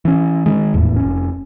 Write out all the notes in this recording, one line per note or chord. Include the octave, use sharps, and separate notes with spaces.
E3 C#4
D#3 G#3
D#1 E2 A2
F1 C#4